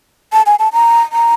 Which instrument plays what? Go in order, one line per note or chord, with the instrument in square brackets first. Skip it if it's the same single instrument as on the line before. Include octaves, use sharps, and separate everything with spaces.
[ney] A5
G#5
A5
A#5
A#5